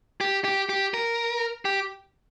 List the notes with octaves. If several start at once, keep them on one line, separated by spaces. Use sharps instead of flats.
G4
G4
G4
A#4
G4